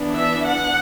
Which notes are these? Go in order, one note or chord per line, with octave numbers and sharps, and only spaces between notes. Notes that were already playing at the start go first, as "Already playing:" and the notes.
Already playing: E3 B3 D4
E5
F#5